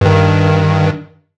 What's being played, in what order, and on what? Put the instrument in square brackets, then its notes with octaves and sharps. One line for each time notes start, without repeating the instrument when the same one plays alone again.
[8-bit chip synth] G2 D#3